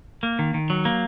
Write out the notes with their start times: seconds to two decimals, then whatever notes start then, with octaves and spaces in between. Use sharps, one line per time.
0.23 A#3
0.39 D#3
0.54 D#3
0.70 F#3
0.85 A#3